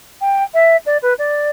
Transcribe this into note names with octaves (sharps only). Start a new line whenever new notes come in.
G5
E5
D5
B4
D5